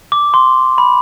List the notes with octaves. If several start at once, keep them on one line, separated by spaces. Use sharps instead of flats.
D6
C6
B5